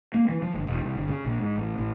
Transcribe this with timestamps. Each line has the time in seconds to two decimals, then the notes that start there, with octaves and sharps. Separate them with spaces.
0.14 A#3
0.29 E3
0.42 F3
0.54 G1
0.67 E1
0.81 C2
0.95 G1
1.08 C#3
1.24 A#1
1.39 G#2
1.56 A1
1.78 A1